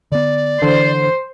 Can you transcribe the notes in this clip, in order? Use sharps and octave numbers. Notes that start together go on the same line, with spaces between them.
D3 B3 D5
D3 E3 C5